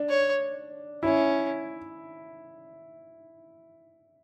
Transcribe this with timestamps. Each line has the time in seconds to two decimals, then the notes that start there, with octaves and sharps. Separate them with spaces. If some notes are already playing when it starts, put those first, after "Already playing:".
Already playing: D4
0.09 C#5
1.03 C#4 E4